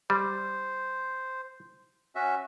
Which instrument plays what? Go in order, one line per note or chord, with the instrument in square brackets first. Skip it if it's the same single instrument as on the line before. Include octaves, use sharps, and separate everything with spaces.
[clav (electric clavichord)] G3 [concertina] C5
[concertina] C#4 F#4 E5